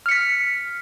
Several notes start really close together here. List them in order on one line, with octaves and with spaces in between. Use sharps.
F6 C#7 B6